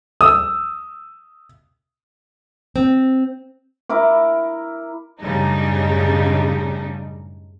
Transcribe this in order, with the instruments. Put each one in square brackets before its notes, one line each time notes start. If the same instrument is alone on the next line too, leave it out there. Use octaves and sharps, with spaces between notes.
[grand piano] D#6 E6
[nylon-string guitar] C4
[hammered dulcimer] E4 A#4 D6
[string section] F#2 A2 C#3 G3 D4 D#4